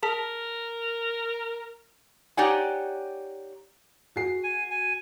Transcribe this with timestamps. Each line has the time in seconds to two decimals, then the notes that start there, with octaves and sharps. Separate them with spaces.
0.03 G#4 A#4 A5 B6
2.37 D#4 G4 C#5 D5 F#5 G#5
4.16 F#4 G#4 C7
4.44 G#5
4.70 G#5